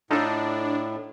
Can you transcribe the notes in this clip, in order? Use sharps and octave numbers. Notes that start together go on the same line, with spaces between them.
A2 D4 D#4 F4 A4